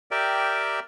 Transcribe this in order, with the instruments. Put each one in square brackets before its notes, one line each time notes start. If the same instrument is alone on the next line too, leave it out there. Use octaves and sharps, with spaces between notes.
[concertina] G4 A#4 D5 E5 G5